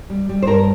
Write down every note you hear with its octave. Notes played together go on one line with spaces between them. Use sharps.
G3
G3
C5
G2 A#4